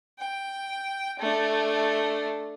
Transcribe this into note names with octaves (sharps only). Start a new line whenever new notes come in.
G5
A3 D4